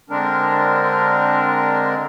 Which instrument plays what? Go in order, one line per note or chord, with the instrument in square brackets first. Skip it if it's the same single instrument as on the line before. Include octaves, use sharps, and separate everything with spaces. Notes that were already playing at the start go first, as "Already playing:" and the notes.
[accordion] D3 G#3 C4 D4 A#4